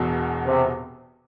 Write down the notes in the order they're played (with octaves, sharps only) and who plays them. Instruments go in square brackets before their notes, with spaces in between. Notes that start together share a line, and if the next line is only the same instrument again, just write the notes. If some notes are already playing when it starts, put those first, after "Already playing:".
Already playing: [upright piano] E1 E2 B2
[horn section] C3